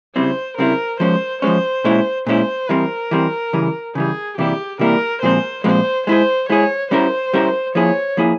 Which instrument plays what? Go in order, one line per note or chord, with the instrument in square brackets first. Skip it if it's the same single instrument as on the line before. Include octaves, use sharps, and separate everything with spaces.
[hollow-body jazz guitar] C#3 G3 C4 E4 [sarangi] C5
[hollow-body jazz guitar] C#3 G3 C4 E4 [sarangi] A#4
[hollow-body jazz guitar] F3 G#3 C#4 [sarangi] C5
[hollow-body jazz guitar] F3 G#3 C#4 [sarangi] C5
[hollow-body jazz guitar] A#2 G#3 C#4 E4
[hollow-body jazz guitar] A#2 G#3 C#4 E4 [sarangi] C5
[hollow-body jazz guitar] E3 G3 C4 [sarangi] A#4
[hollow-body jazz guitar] E3 G3 C4
C#3 E3 G3
[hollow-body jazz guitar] C#3 E3 G3 [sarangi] G#4
[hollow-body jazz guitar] C3 E3 G3 A#3 E4 [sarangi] G4
[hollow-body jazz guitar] C3 E3 G3 A#3 E4 [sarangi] A#4
[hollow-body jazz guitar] A#2 F3 G#3 C4 [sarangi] C5
[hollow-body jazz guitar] A#2 F3 G#3 C4 [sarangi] C5
[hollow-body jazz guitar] G#3 E4 G#4 [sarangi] C5
[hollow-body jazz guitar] G#3 E4 G#4 [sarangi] C#5
[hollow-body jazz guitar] G3 C#4 E4 A#4 [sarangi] C5
[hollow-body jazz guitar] G3 C#4 E4 A#4
[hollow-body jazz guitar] F3 A#3 E4 G#4 [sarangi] C#5
[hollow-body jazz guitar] F3 A#3 E4 G#4